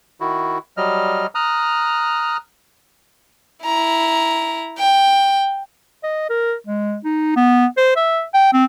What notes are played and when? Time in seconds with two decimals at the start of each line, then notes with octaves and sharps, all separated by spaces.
0.20 D#3 E4 F#4
0.77 F#3 G3 D#5 F6
1.35 A#5 D#6 F6 F#6
3.65 E4 A#5
4.78 G5
6.04 D#5
6.30 A#4
6.67 G#3
7.05 D#4
7.36 B3
7.77 C5
7.96 E5
8.34 G5
8.53 C4